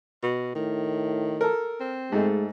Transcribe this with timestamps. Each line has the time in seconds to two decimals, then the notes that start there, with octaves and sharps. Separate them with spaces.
0.23 B2
0.55 A2 D#3
1.41 A4 A#4
1.80 C4
2.12 G#2 G#3 A3